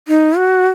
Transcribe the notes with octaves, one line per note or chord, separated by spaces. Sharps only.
D#4
F#4